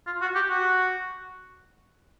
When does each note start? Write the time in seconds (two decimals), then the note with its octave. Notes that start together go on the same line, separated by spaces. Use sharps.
0.07 F4
0.21 F#4
0.35 G4
0.50 F#4